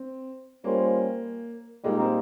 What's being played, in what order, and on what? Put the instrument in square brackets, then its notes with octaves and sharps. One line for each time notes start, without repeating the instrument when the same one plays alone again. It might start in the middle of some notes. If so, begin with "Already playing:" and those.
Already playing: [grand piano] C4
[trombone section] G3 C#4 F4 C5 [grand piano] A#3
[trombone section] A#2 G3 A#3 D#4 A#4 [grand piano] G#3
[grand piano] C4